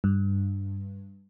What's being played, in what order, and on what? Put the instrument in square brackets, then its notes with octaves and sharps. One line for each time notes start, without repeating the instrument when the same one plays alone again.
[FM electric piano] G2